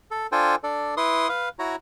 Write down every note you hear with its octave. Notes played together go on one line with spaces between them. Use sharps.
A4
D4 F4 A4 C5 G5 G#5
D4 A4 D5
E4 B4 C6 D#6
B4 F5
E4 F#4 C#5 A#5